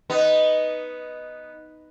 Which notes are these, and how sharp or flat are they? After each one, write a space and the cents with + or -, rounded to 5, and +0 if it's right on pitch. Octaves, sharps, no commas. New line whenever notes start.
B3 +0 D#4 +0